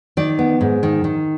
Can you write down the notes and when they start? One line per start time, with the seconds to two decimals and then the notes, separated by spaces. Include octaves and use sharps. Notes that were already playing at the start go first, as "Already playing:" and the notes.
0.17 D#3 D5
0.39 B3
0.61 G#2
0.83 D#3
1.04 D#3